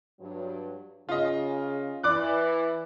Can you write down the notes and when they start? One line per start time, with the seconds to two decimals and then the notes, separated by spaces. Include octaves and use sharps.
0.20 G2 F#3
1.09 C#3 F4 D#5
2.03 E3 D5 D6 F#6